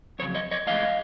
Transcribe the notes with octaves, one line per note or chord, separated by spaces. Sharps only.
F2 C#3 F#3 C#5
C#5 D#5
C#5 D#5
A2 E3 G#3 D#5 F5